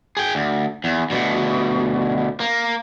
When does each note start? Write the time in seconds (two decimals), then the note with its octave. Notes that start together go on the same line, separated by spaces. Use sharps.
0.17 G#4 G5
0.35 D2
0.84 E2
1.10 D2 B2
2.40 A#3